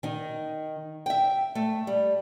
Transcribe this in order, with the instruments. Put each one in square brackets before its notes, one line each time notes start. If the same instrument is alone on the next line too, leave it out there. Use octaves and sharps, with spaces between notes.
[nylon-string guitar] D#3 D#4
E5 G5
A3
G3